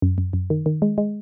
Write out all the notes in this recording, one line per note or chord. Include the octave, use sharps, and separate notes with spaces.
F#2
F#2
F#2
D#3
D#3
G#3
G#3